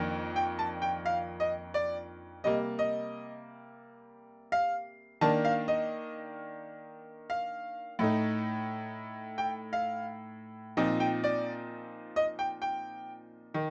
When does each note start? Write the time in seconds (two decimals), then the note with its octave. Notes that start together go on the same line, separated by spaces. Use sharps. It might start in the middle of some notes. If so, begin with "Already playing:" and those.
Already playing: F2 D#3 A#3 D4
0.36 G5
0.59 A5
0.82 G5
1.06 F5
1.40 D#5
1.74 D5
2.44 C3 G3 A#3 D#5
2.79 D#5
4.52 F5
5.21 D#3 A#3 D4 A5
5.45 F5
5.68 D#5
7.30 F5
7.99 A2 A3 D#4
9.38 G5
9.73 F5
10.77 A#2 F3 C4 D#4
11.00 G5
11.24 D5
12.16 D#5
12.39 G5
12.62 G5
13.54 D#3